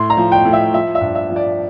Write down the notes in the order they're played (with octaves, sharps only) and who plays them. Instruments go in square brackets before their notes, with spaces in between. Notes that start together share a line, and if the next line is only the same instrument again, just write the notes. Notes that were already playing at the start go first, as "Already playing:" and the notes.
Already playing: [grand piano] A2 C6
A#5
F3
G5
A2
E5
F3 E5
E5
G2
E5
F3
D5